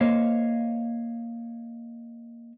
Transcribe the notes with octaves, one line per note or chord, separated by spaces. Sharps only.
A#3 C5 C#5 D#5 F5